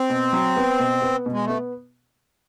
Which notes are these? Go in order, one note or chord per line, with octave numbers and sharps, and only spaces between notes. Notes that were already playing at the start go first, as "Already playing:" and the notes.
Already playing: C4
B2
F#3
B3
B2
B3
B2
G#3
A3 B3